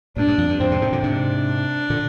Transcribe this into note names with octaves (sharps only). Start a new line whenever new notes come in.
G2 A#2 D4
G2
F2
G2
F2 G#2 C4
G#2 C3
G#2 C3
A#2 D3
G#2 C3 D4
A#2 D3